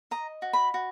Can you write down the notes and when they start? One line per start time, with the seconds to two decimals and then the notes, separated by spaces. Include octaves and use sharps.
0.11 D#5 A#5
0.42 F#4
0.53 B5
0.74 F#4